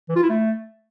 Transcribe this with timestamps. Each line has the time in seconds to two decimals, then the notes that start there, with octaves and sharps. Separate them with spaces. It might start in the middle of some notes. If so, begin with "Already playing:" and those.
0.09 E3
0.16 F4
0.23 E4
0.29 A3